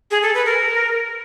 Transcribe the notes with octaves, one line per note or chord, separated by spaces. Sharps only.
G#4
A4
B4
A#4